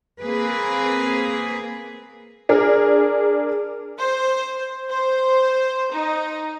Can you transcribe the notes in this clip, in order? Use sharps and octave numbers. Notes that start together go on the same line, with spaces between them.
A#3 C4 G#4 B4
D4 G#4 A#4
C5
C5
D#4